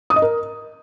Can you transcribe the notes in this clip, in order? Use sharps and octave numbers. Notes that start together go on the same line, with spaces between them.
D#6
D#5
A#4